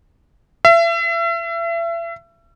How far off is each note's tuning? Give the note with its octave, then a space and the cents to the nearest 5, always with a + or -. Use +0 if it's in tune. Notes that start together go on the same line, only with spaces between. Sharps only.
E5 +35